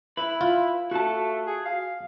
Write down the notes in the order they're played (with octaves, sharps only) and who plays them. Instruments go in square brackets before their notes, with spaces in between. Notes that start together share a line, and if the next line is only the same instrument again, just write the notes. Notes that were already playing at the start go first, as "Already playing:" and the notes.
[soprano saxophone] E4 [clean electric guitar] B4
[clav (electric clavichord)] F4
[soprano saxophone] A3 [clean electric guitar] F#4 A5
[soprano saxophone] G#4
F5